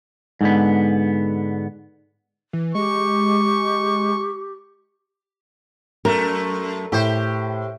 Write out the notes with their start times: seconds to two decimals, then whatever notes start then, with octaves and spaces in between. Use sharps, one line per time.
0.41 G#2 D3 B3
2.53 E3
2.75 G#3 G4 C#6
6.05 F#2 A3 A#4
6.92 A2 G4 C5